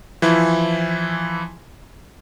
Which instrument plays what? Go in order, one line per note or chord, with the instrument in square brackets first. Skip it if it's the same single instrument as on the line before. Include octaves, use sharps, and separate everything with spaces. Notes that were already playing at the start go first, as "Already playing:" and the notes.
[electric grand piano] E3 F3 E4